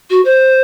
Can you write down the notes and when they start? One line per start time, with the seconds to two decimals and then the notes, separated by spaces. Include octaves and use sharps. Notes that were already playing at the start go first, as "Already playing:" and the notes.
0.10 F#4
0.25 C5